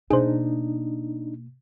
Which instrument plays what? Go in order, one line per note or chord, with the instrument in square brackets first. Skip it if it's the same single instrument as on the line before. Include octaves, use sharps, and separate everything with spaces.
[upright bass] B2 A#3 [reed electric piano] D4 D#4 [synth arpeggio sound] G#4 C5